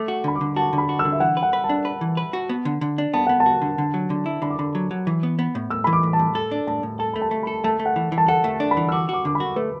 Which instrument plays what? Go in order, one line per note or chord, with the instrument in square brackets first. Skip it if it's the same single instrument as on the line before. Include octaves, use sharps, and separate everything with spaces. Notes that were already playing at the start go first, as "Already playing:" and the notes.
Already playing: [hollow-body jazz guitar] A3 [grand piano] D6
[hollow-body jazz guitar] F#4
[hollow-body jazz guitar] D3 [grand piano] B5
[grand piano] D6
[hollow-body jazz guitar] D3
[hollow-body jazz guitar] F#4 [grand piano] A5
[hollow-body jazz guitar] D3
[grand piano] B5
[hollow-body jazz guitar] F#4
[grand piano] E6
[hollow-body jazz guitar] D3
[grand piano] E5
[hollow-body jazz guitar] E3 [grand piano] F#5
[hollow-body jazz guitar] B4
[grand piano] F#5
[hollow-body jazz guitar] B4
[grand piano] A5
[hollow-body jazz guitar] D4
B4
E3
B4
F#4
B3
D3
D3
D4
[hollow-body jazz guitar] B3 [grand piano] A5
[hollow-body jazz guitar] B3 [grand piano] F#5
[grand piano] A5
[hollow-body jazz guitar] F#4
D3
D3
F#3
D3
E4
[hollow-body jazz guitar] D3 [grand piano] B5
[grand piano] D6
[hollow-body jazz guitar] D3 [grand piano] B5
[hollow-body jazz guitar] F#3
F#3
E3
B3
B3
A2
[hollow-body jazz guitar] A2 [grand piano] E6
[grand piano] B5
[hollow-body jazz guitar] E3
[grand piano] D6
[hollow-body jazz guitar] A2
[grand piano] A5
[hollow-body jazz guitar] A2
A4
D4
[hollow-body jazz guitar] A2 [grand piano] A5
[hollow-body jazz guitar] A2
[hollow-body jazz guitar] A4 [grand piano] A5
[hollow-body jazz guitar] A3 [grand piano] B5
[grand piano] A5
[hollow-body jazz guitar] A3
[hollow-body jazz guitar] A4 [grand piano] B5
[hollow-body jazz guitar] A3 [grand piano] A5
[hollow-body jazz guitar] A3
[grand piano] F#5
[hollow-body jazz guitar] E3
E3
[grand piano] A5
[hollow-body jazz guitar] A4 [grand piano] F#5
[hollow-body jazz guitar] A3
D4
[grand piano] B5
[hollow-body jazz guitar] E3
[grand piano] E6
[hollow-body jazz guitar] F#4 [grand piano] D6
[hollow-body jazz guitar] F#4 [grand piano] D6
[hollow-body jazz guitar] D3 [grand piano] D6
[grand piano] B5
[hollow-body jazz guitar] F#4
[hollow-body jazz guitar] A3 [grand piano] B4